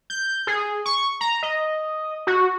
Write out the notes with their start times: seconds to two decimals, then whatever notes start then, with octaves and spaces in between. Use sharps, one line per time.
0.10 G6
0.47 G#4
0.86 C#6
1.21 A#5
1.43 D#5
2.27 F#4